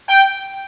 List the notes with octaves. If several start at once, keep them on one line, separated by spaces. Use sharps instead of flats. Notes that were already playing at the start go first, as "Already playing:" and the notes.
G5